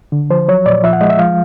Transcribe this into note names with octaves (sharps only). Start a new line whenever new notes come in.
D3
F3 C5
F#3 C#5
A#2 D5
F3 E5
F#5
G#3 D#5
E5
F3 F5